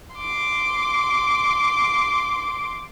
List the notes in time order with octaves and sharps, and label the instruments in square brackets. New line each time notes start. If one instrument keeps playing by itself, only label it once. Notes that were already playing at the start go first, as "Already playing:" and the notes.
[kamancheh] C6 D6